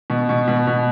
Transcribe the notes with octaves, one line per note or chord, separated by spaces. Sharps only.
B2
B2
B2
B2